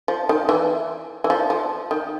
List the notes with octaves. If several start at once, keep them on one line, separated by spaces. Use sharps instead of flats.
F3
D#3
E3
E3
F3
F3
D#3